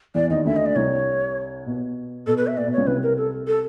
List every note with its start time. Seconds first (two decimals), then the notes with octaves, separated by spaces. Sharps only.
0.15 E2 E3 D5
0.30 D#2 D#3 D#5
0.45 D2 D3 E5
0.56 D#5
0.66 D5
0.75 C2 C3 C#5
1.66 B2
2.27 B2 A4
2.37 B4
2.47 E5
2.57 A#2 D5
2.67 B2
2.73 C#2 C#3 C#5
2.87 C2 C3 B4
3.03 A#4
3.17 A4
3.47 A4